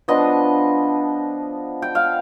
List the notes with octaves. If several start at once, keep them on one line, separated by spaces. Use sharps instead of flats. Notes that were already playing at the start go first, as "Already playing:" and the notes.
F3 B3 D4 D#5
G5
F5